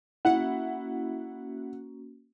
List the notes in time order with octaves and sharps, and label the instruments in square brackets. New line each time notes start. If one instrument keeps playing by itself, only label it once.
[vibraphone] A#3 C#4 F#4 [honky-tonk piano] E4 [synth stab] F#5